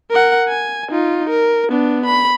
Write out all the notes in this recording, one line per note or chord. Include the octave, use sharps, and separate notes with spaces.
A#4 F#5
G#5
D#4 F4
A#4
B3 D4
B5